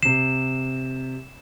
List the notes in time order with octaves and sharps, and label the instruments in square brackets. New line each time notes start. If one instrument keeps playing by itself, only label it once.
[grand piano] C3 C7 [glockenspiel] E7